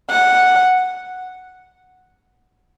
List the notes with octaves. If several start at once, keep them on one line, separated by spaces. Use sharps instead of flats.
F#5